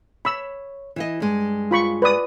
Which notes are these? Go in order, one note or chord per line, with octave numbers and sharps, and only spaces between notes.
C#5 B5 E6
E3 E4 D#5
G2 G#3
F4 B5 C#6
B4 D5 D#6